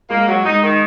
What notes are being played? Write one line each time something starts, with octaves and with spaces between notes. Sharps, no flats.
G#3 A#3
F#3
G#3 D#4
D#3